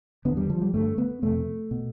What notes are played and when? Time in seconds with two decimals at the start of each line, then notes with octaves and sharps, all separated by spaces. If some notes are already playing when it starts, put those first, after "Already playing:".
0.25 E2 D3 B3
0.37 G3
0.50 F3
0.62 G3
0.74 G2 D3 A3
0.98 B3
1.22 F2 C3 A3
1.71 B2